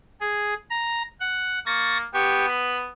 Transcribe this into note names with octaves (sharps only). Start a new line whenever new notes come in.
G#4
A#5
F#5
A#3 C#6 A6 A#6
B3 G4 C#6
B5